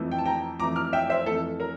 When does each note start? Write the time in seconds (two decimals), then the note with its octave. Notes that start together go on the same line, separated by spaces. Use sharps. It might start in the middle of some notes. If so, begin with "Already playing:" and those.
Already playing: F2 E3 A3
0.12 G5
0.18 A5
0.25 G5 A#5
0.59 F2 E3 A3 A#5 D6
0.76 D6 F6
0.93 E5 G5
1.09 C5 E5
1.26 F2 E3 A3 A4
1.60 A#4